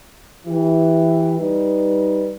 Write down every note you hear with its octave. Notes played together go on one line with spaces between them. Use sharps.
E3 G4
G3 D#4 B4